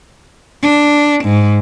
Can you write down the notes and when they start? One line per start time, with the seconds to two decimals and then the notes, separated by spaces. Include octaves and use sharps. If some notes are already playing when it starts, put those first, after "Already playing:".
0.63 D4
1.25 G#2